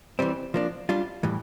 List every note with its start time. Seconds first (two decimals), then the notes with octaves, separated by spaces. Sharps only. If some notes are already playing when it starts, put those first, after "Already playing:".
0.19 E3 G3 C4
0.54 F3 A#3 D4
0.89 G3 D4 F4
1.23 A2 E3 G3